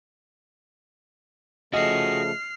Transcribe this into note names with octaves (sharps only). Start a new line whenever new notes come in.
C#3 F3 A3 F#4 G#4 D#5 F6 C7